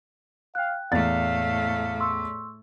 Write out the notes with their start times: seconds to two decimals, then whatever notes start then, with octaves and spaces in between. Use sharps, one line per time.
0.55 F5 G5 F#6
0.92 E2 A2 A3 F5 A6
2.00 C6 C#6 E6